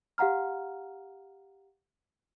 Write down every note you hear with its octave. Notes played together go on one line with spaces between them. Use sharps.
G4 F5 F#5 A#5 F6